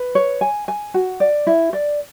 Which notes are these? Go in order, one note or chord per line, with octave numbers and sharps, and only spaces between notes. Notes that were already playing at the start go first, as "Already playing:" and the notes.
Already playing: B4
C#5
G#5
G#5
F#4
D5
E4
D5